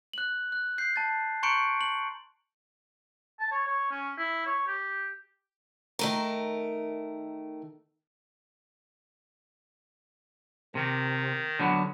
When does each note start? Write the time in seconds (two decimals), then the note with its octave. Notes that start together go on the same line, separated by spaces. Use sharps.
0.13 F#6 F#7
0.52 F#6
0.78 G6 C7
0.96 A5 A6
1.43 A#5 C6 C#6 G6 C#7 D7
1.81 F#7
3.40 A5
3.52 C#5
3.67 C#5
3.91 C#4
4.18 E4
4.46 C#5
4.67 G4
5.99 D#3 A3 A#4
10.75 C3 D#3
11.59 D3 F#3 B3